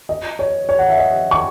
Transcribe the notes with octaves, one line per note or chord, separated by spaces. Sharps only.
D#5
C#5
C#5
F#5
E5
D#5
C#6